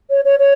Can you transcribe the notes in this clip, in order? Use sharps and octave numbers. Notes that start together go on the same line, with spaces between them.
C#5
C#5
C#5